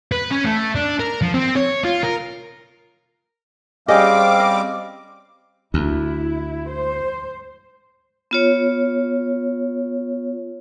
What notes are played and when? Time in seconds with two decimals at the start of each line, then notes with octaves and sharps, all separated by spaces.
0.12 B4
0.31 C#4
0.44 A3
0.75 D4
0.99 A#4
1.22 F3
1.34 C4
1.56 C#5
1.85 F4
2.03 A#4
3.88 G3 C4 C#4 G4 G#4 D#5 F5 D6
4.40 D#5
5.74 D2 E4
6.69 C5
8.31 B3 F4 C#5